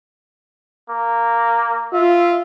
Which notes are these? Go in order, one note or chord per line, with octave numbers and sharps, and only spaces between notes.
A#3
F4 E5